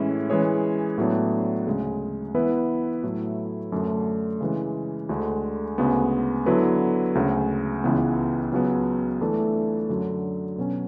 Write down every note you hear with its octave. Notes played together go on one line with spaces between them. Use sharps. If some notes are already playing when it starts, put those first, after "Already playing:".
Already playing: A2 E3 G#3 C#4 E4
E3 G#3 C#4 G#4 C#5
A2 F#3 B3 D4
D2 C#3 G#3
E3 B3 E4 B4
A2 F#3 A3 E4
F#2 D3 A3 D4 F#4
C#3 E3 G#3
D2 D3 G#3
D2 C#3 G#3 B3
D3 F#3 B3 E4 B4
D2 C#3 G#3
C#2 C#3 E3 B3
C#2 C#3 F#3 B3
E3 A3 D4 A4
F#2 D3 F#3
B2 F#3 C#4